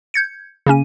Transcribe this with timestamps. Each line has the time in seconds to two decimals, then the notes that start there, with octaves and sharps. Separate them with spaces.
0.14 G6 G#6 C#7
0.66 C#3 A#3 C#4 D#7